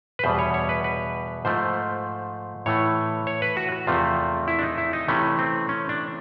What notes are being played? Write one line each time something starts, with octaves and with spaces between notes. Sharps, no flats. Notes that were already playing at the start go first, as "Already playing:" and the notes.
B4
E2 B2 G3 C5
C#5
C#5
B4
B4
G#2 F3 A3 C5
A2 E3 A3 C#5
C#5
B4
F#4
F#4
E2 C3 F3 A3 F4
E4
D4
D#4
E4
D#4
C3 E3 A3 C#4
C4
C#4
D4